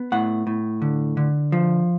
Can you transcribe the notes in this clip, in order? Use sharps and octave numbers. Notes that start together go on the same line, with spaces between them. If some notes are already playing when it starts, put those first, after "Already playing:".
Already playing: B3
A2 F#5
A2
D3
D3
F3